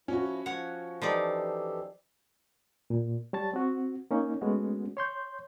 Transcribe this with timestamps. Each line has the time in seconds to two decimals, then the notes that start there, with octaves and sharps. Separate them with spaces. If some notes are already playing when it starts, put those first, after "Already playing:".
0.08 F3 C#4 E4 F#4
0.46 F3 C#5 F#5
1.02 E3 F3 D#4 G4 A4 D5
2.90 A#2
3.33 G3 C#5 A5 A6
3.54 C4 F#4
4.11 A#3 C#4 D#4
4.41 G#3 A3 B3 C#4 F#4
4.97 C#5 C6 G6